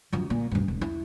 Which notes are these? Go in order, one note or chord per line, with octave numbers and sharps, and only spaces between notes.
F#2 F3
A#2
D#1 G2
E1
E4